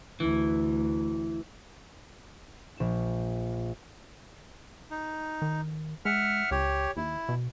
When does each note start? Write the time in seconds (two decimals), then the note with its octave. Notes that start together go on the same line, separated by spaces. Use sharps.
0.20 D2 E3
2.77 A#1 E7
4.91 D#4
5.42 D#3
6.05 G#3 E5 F#5 F6
6.51 C#2 G4 C#5
6.97 D#2 E4
7.29 B2